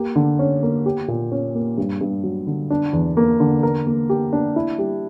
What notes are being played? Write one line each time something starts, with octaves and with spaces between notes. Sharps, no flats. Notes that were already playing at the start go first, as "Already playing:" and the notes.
Already playing: A#3 G4
D3
C#4
A#3
G4
A#2
C#4
A#3
G2
G2
F#3
D3
D4
E2
A#3
D3
A#4
A#3
G4
D4
E4
G3